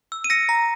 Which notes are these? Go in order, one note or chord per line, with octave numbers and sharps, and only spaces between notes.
E6
D#7
E6 A#6 C#7
A#5